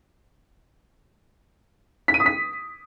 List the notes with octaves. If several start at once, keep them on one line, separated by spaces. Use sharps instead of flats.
B6
D#7
D#6
B6